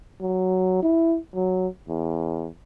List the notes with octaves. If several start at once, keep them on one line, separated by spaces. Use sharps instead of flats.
F#3
E4
F#3
E2